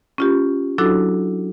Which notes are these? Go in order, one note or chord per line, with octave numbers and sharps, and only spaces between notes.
C#4 F4 G4
F#3 D4 E4 F#4 A4